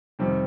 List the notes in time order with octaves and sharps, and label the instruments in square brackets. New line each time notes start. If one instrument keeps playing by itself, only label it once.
[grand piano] F2 C3 D#3 G3 C4